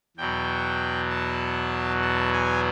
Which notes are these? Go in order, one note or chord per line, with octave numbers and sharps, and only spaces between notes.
E2 B2 F#3 G5
A5
A5
G#5